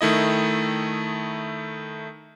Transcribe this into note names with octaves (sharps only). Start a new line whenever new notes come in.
D#3 A3 E4 D#5